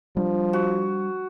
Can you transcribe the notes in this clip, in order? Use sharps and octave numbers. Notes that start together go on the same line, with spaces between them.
F3 G3 D4
F#4